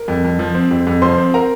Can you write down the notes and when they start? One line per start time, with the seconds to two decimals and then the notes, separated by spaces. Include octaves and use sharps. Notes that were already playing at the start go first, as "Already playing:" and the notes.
Already playing: A#4
0.08 F2
0.24 F2
0.39 F3
0.55 C4
0.71 F2
0.87 F2
1.02 F3 C5 C6
1.18 C4
1.34 A#4 A#5